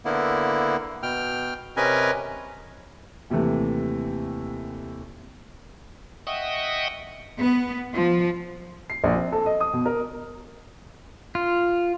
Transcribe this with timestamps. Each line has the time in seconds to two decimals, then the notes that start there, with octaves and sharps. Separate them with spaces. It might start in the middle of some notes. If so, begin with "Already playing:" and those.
0.05 D3 A#3 B3 E4
1.03 B2 G5 F6
1.77 C3 C#4 A#4 B4 D#5 G#5
3.30 D#2 C3 E3 A3
6.27 D#5 E5 F#5 G5 C#6 D#6
7.38 B3
7.94 F3
8.90 C7
9.04 A#1
9.15 C4
9.32 A4
9.46 D#5
9.60 D#6
9.73 B2
9.86 A#4
11.35 F4